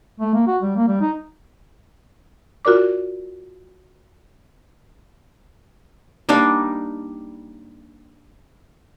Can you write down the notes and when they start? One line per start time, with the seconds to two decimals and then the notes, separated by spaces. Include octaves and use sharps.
0.20 A3
0.34 A#3
0.47 F#4
0.62 G3
0.76 A#3
0.87 G3
1.01 D#4
2.65 F4 F#4 A#4 D5 D6
6.29 G3 A#3 D4 D#4